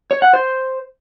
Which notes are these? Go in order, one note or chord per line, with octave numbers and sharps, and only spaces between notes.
C#5
F#5
C5